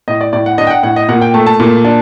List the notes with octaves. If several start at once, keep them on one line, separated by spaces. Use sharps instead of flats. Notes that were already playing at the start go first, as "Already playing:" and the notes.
A2 D#5
D5
A2 D5
F#5
D4 D#5
G5
F#5
A2 F#5
D#5
A#2 F#5
G5
A3 A5
A5
A#2
D4